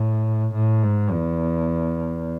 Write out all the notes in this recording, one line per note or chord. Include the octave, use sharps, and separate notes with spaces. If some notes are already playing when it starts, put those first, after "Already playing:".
Already playing: A2
A2
G#2
E2